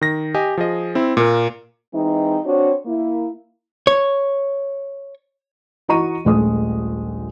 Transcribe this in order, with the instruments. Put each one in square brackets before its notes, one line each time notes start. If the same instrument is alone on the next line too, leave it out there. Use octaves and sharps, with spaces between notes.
[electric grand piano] D#3 A#6
G4 D#5 G#5
F3 G#4 D#5
C4 E4
A#2 A#3 A#4
[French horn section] E3 G#3 C4 D#4
C4 D4 F#4 C#5
A#3 E4
[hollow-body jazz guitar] C#5
[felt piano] E3 F#4 D#5 A#5 C#6 D#7
D#1 A#1 G#3 A3 D#5 D#6